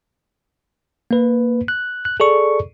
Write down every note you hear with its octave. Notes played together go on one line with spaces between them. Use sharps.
A#3 B4
F#6
F#6
G#4 A4 D5 C#6